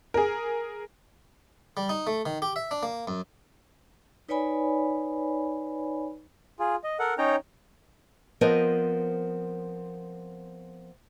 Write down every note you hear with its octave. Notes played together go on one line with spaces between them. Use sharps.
G#4 A#4
G3
D#4
A3
D#3
G4
E5
D4
A#3
F#2
D#4 B4 C#5 D5 G#5 B5
F4 G#4
D#5
A4 A#4 F#5
C#4 D#4 C#5 G5 A#5
F3 B3 C4 A#4 B4 D#5